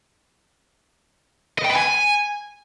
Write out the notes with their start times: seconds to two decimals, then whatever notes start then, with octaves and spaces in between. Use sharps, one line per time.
1.59 D#5
1.64 G5
1.70 B4
1.75 G#5